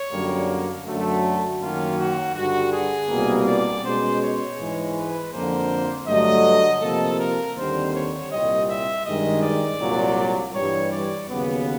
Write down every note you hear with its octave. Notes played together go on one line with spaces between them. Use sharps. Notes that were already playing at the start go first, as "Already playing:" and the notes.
Already playing: C#5
F#2 D3 G3 A#3
F#2 D3 F#3 A3
F#4
F#2 D#3 F#3 A#3 C#4 F4
F#4
G2 D3 G3 F#4
G#4
C2 B2 G3 A#3
D5
B2 G#3 C#4 C5
C#5
G#2 E3 G#3
B4
F2 D3 F3 A#3 C5
G2 D3 F#3 A3 D#5
C3 F3 A#3 A4
A#4
D#2 D3 G3 C4 C5
C#5
C2 A#2 G3 C4 D#5
E5
G2 D#3 G#3 D#5
D5
C2 A#2 F#3
G2 E3 G3 C#5
D5
D#2 C#3 F#3 B3